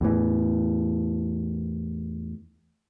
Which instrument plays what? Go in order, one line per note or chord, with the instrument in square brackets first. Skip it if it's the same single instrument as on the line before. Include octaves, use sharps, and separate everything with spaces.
[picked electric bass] E2 A2 E3